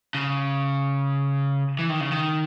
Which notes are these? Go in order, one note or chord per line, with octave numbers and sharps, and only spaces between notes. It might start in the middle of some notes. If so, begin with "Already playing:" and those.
C#3
E3
D#3
C#3
D#3